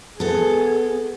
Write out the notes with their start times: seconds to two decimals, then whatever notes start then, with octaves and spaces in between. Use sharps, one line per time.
0.20 B3 G#4 A4